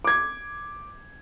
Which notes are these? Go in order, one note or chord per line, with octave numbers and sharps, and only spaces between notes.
D6 G#6